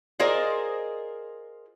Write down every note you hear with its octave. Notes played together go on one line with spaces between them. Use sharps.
F4 G#4 A#4 C5 D5 D#5